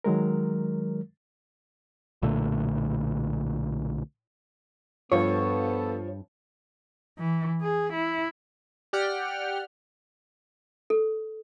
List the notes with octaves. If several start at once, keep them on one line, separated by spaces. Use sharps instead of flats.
D#3 F#3 G#3 A#4
B1 A#2 D3 A3
G2 F3 B3 A4 C#5
E3
G#4
E4
G4 D5 F#5 G5 F6
A4